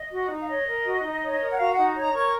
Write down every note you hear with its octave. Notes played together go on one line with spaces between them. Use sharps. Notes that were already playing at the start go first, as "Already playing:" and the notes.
Already playing: D#5
F#4
D#4
F5
C#5 D#5
A#4
F#4
D#4
C#5
A#4
F#5
F#4 F5
D#4 F#5
C#5 A#5
A#4 C#6